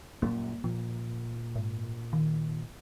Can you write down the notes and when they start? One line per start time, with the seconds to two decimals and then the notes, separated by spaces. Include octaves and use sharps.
0.22 F#2 A#2 G3 A#3
0.64 A#2 F3
1.55 G#2
2.13 D#3